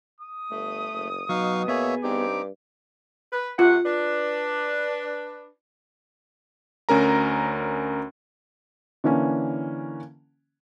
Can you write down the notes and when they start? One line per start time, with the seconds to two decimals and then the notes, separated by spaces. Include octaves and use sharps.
0.20 D#6
0.50 G1 A3
0.93 F#1
1.29 B2 F#3 D#4 F5 C#6
1.68 A#3 B3 G#4 C#5 E5
2.03 G2 C4 D#4 G4 D6
3.32 B4
3.59 C3 A3 F4 F#5
3.85 D4 B4
6.89 D2 C#4 A#4 A#5
9.04 D3 E3 A#3 C#4